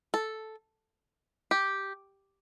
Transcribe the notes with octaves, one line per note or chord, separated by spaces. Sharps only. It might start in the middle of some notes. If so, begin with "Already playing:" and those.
A4
G4